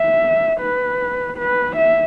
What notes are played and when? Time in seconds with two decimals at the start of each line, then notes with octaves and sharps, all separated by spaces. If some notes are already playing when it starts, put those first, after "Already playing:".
Already playing: E5
0.60 B4
1.38 B4
1.76 E5